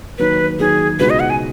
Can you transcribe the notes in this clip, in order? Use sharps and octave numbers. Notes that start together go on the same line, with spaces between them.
D#2 D#3 F#3 B4
D#2 D#3 F#3 G#4
C#2 B2 G#3 D#4 F#4 B4
D#5
F#5
G#5